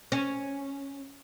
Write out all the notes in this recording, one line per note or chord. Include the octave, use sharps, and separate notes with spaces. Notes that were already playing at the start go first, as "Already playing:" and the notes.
C#4